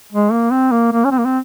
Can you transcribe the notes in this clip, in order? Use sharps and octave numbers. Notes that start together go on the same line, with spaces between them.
G#3
A#3
C4
A#3
A#3
C#4
C4
A#3
C4